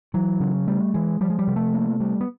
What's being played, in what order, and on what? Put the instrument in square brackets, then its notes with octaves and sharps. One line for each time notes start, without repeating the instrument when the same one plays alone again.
[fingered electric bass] E3 [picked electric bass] F#3
[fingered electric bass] C#3
[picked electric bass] G3 [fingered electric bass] A3
[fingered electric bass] E3 [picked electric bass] G#3
[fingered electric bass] F3 [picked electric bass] G3
[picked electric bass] G#3
G3
[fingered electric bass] C3
[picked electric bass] A3
[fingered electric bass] A#3
G3
[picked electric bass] B3